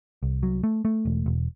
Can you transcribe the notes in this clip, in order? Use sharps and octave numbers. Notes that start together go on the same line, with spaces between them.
C2
F#3
A3
A3
E1
E1